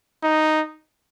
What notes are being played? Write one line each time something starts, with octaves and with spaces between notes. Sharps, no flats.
D#4